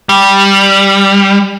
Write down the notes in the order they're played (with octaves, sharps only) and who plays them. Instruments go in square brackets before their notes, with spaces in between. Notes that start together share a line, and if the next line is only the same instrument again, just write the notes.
[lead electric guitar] G3